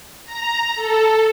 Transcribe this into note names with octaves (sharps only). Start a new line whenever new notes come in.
A#5
A4